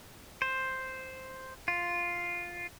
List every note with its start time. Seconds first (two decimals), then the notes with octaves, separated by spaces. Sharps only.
0.42 C5
1.68 F4